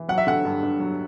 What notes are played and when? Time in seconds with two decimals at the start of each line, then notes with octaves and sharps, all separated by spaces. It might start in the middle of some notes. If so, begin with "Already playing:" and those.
Already playing: E3
0.09 F#3 F#5
0.18 E5
0.27 D3 F#5
0.45 G2
0.63 G2
0.80 F#3